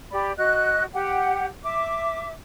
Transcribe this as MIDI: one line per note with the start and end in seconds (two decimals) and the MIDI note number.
0.11 0.32 67
0.11 0.32 74
0.11 0.32 83
0.37 0.84 66
0.37 0.84 75
0.37 0.84 90
0.93 1.46 67
0.93 1.46 78
0.93 1.46 79
1.64 2.32 76
1.64 2.32 86